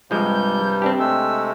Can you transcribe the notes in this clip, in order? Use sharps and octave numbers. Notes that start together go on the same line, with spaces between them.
G2 C3 F3 G3 G#3 G6
C4 D4 G4 A5
C3 G#3 A3 E6